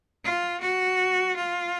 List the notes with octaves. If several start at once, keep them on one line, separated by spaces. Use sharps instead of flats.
F4
F#4
F4